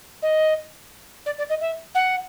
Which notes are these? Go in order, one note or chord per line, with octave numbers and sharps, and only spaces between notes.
D#5
D5
D5
D#5
E5
F#5